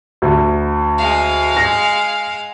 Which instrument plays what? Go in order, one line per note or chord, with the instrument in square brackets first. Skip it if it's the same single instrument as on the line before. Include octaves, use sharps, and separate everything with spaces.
[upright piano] D2
[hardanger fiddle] G#3 F5
[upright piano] A#6